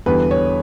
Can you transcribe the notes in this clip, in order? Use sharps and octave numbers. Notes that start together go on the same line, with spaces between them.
E2 D3 G3 B3 B4
C#5